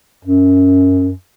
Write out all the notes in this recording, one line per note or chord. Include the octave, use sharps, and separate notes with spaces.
F#2